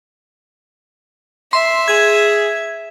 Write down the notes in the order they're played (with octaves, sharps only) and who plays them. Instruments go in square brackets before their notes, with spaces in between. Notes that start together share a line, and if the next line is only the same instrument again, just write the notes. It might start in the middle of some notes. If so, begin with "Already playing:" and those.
[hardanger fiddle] E5 [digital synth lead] C6
[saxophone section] G#4 [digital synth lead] G#6